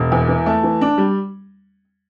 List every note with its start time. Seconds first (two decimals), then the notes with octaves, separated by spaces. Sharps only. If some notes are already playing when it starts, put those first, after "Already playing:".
Already playing: E1
0.12 E2
0.28 E3
0.46 A3
0.63 E3
0.81 D4
0.98 G3